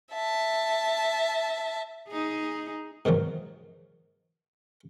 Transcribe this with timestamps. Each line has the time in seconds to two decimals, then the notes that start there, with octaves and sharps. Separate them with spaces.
0.13 E5 A5
2.09 D#4 G#4
3.05 G#2 B2 D#3 F3 F#3